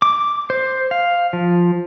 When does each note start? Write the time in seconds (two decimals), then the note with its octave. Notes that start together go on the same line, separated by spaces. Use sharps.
0.02 D6
0.50 C5
0.91 F5
1.33 F3